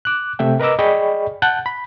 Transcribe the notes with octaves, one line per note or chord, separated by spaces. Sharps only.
D6 F#6
C3 A3 E5 G5
A#4 B4 D#5 A#5 D6 E6
G#4 D5 D#5 G5 B5 C#6
F#5 A5 F#6 G6
B5